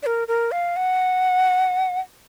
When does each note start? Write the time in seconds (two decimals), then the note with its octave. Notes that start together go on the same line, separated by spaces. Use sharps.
0.03 D5
0.06 A#4
0.28 A#4
0.52 F5
0.76 F#5